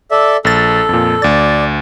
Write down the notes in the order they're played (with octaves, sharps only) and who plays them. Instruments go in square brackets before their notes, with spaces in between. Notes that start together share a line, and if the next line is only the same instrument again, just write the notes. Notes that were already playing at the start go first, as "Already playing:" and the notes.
[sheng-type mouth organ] A4 D5 E5
[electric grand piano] A#1 A6 [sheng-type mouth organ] A4
[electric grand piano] F2 A#2
[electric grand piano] D2 A6 [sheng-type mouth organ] D5